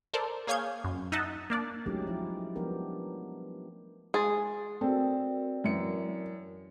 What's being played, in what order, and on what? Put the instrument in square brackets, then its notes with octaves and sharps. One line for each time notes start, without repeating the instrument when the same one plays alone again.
[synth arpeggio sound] A4 A#4 C5 D5 A5
A#3 G#4 C#5 F5 G6 G#6
F#2
D#4 D#5 E5 F#5 A5
A#3 D4 D5
[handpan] F#3 G#3 A3 C#4 D#4 G4
F3 E4
F3 G3 B3 D4 G4 A#4
[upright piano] G#3 C6 A6 [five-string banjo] G#4
[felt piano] C4 [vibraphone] F#4 A#4 D5 [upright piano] A4
[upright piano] F#2 E3 C#7